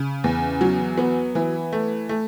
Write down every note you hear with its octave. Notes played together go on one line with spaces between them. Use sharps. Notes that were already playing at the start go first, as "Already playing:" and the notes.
Already playing: C#3
E2
F#3
B3
E3
A3
A3